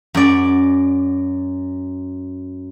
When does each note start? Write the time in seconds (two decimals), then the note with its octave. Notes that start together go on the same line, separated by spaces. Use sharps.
0.15 F#2 D5